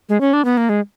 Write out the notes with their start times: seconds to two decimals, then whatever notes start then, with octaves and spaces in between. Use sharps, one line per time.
0.09 G#3
0.21 C#4
0.33 D4
0.45 B3
0.57 A#3
0.69 G#3